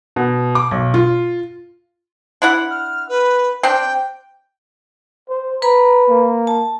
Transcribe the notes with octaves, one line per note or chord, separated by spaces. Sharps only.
B2
D6
B1
F4
D4 E4 F#5
F6
B4
C4 D4 G5
C5
B4 A#5 B5
A#3
A5